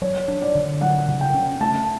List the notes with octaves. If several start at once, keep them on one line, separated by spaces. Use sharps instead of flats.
F#3 C#5
D4
D5
D3
F#3 F#5
C#3
G5
C#4
A3 A5